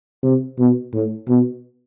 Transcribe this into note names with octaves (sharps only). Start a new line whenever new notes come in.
C3
B2
A2
B2